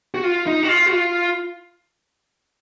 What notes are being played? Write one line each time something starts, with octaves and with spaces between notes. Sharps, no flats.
F#4
F4
D#4
F#4
F4
F#4
F4